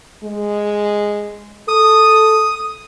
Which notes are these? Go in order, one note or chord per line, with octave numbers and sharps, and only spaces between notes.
G#3
A4 D#6